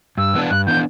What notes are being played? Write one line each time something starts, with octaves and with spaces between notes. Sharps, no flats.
G2 E6
E3 B3 D4
G2 F#6
E3 B3 D4 G6